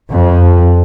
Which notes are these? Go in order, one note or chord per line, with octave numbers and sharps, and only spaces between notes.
F2